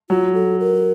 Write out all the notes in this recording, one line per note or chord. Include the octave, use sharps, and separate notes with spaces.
F#3 F4
A4
A#4